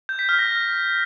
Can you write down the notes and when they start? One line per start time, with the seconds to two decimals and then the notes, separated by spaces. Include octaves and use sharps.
0.09 G6
0.19 B6
0.29 F6
0.39 A#6